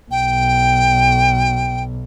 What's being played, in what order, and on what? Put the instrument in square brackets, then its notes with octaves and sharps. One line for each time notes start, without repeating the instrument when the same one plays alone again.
[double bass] B1 [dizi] G5